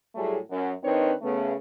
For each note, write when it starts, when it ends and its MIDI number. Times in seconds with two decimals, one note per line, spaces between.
0.15 0.37 45
0.15 0.37 54
0.15 0.37 55
0.15 0.37 57
0.15 0.37 68
0.51 0.70 42
0.83 1.12 51
0.83 1.12 60
0.83 1.12 62
0.83 1.12 63
0.83 1.12 71
0.83 1.12 73
1.22 1.54 49
1.22 1.54 57
1.22 1.54 59